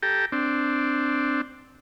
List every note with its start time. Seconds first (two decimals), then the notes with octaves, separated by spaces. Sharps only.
0.03 G4 A4 G5 A#5
0.32 C4 D4